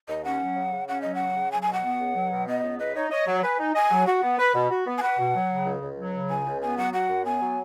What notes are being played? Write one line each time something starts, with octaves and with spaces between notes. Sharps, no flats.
D#2 D#5
C#4 F#5
F#3
C#3
C#3
C#4 F#5
F#3 D#5
F#5
C#3
C#3
F#3 G#5
G#5
B2 F#5
B3
C#2
F#3
B2
B3 D#5
C#2
B4 D#5
D#4 C#5
C#5 D#5
F#3
B4 G#5
D#4
D#5 G#5
F#3
F#4 F#5
B3
B4 B5
B2
F#4
B3
G#5
B4 F#5
B2
F#3
C#3
C#2
C#2
F#3
C#3
C#2 G#5
C#2
B3 G#5
F#3 F#5
F#4 F#5
F#2
B3 G#5
F#3